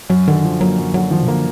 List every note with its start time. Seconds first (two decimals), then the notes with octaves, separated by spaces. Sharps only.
0.10 F#2 F#3
0.28 D3 D#3
0.44 F3
0.60 F#3 A#3
0.78 F#2
0.94 D3 F#3
1.11 D#3 F3
1.23 B2
1.28 D3 A#3